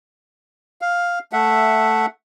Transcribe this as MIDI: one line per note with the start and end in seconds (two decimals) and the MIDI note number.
0.81 1.19 77
1.33 2.06 57
1.33 2.06 76
1.33 2.06 78